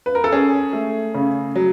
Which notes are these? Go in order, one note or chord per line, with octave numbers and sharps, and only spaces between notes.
B4
A#4
A4
C#4 G#4
A3
C#3
F#3